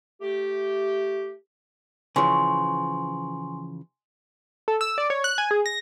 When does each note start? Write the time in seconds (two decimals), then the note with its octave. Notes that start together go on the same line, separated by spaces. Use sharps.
0.21 A3 G4
2.16 C#3 E3 F3 G#5 C6 C#6
4.68 A4
4.81 E6
4.98 D5
5.10 C#5
5.24 F#6
5.38 G#5
5.51 G#4
5.66 A#6